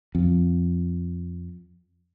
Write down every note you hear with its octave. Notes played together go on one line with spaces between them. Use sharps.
F2